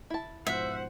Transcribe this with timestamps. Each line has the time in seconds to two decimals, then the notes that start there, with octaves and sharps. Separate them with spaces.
0.10 E4 A5
0.47 G#2 B2 F3 C5 E5 F#5